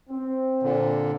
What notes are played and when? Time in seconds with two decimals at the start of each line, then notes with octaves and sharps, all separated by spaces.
0.10 C4
0.63 A#2 D3